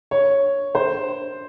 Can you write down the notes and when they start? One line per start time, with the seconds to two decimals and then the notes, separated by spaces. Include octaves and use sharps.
0.11 C#5
0.75 C5